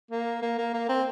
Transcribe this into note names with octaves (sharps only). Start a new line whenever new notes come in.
A#3
A#3
A#3
A#3
C4